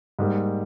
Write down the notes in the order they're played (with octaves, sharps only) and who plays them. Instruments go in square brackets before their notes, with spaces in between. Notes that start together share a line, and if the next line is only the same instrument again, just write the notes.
[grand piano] G#2 G3 A#3